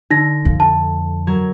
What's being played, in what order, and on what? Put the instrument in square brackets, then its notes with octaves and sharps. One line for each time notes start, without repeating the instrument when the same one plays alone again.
[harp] D3 [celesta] D#4 A#6
[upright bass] F2
[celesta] A5
[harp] F#3 A#4 G#6